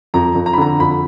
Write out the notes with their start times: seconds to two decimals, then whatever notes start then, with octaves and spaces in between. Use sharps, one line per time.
0.14 F2 A#5
0.35 F2
0.46 A#5
0.53 B5
0.58 D3 A#5
0.79 F2 B5